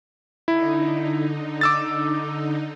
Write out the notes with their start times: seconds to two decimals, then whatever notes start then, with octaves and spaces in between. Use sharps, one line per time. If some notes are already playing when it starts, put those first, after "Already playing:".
0.48 D3 D#4 E4
1.61 D6 E6 A6